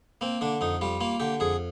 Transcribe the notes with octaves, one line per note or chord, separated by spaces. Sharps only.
A#3 C4
D3 D4
F2 D#4
G3 F4
A#3 F4
D3 G4
F2 G#4